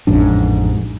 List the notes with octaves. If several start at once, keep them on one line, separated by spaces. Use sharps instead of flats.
A1 F2 G#2 D4